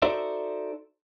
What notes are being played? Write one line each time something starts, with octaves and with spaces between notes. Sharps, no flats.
D#4 F#4 A4 C5 D5 E5